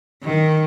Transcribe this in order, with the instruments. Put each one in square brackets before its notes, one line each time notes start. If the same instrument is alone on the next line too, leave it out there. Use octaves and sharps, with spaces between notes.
[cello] D#3